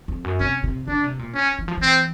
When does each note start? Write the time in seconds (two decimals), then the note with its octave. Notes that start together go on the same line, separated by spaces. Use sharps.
0.08 F2
0.24 F#2
0.40 C3 C#4
0.64 C3
0.88 C#3 D4
1.04 C3
1.19 A#2
1.35 C#4
1.59 E3
1.68 F3
1.77 E3 C4